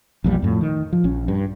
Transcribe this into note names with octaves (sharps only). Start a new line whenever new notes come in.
A#1 E2 A#2 G3
F2 A2
D#3
F3
A#1 C#4
G2